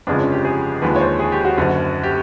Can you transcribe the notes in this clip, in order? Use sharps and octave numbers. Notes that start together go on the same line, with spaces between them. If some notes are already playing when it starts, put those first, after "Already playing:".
G1 F2 C#3 F3 G#3 D4
C#4
G4
G#4
D#2 D3 F3 G#3 B4
C#5
C5
G#4
G4
F#4
F#1 F#2 D3
G4